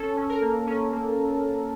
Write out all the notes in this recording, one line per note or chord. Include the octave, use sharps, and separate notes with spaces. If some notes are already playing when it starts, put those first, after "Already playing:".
Already playing: C#4 A4
C#4
A#4
A#3
C#4
A#3